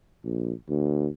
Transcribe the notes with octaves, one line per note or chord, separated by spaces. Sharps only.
A#1
D2